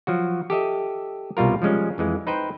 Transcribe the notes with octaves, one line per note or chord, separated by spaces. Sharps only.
F3 F#3 F#4
G4 A4 D#5 E5
C2 B2 G3 F4 A#4
F3 G3 G#3 C#4
F2 E3 G#3
D#4 B4 C5 G5